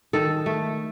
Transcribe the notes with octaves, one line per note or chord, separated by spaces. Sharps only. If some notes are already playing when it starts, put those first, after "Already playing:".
D#3 A4
A3